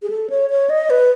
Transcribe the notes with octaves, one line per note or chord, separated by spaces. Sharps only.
G#4
A4
C#5
C#5
D#5
B4